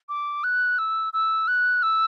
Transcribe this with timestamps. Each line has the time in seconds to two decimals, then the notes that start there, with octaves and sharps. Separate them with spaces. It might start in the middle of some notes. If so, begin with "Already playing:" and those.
0.09 D6
0.44 F#6
0.78 E6
1.13 E6
1.48 F#6
1.83 E6